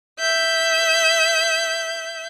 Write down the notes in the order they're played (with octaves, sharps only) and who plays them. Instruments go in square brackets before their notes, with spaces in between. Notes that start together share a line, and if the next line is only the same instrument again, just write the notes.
[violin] E5 G6